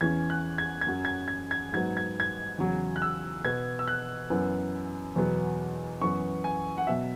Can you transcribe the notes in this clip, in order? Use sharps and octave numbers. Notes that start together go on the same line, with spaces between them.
E2 E3 C#4 G#6
F#6
G#6
G#6
F#2 F#3 C#4
G#6
G#6
G#6
G#2 F#3 B3 G#6
G#6
G#6
E2 C#3 F#3 C#4
F#6
E6
B2 B3 G#6
E6
F#6
F#2 E3 B3
E2 B2 F#3 B3
F#2 E3 B3 C#6
G#5
F#5
B2 F#3 E5